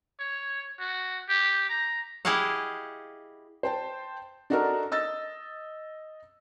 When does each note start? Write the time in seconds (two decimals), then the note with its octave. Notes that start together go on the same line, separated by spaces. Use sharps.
0.19 C#5
0.80 F#4
1.29 G4
1.69 A#5
2.25 E4 G4 G#4 D#5 F5 F#5
3.63 C5 G5 A5
4.50 D4 D#4 F#4 A4 A#4
4.92 D#5 E6 A6